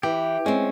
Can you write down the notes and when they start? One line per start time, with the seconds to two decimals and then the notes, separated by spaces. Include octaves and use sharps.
0.03 E3 G4
0.46 G#3 C4 C#4